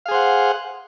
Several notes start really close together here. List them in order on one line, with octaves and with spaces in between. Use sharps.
F5 G#4 C5 F#5